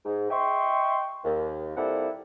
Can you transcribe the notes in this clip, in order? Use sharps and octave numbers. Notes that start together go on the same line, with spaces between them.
G#2
D#5 E5 G5 C6 C#6
D#2
A#2 G3 C4 E4 A4 F#5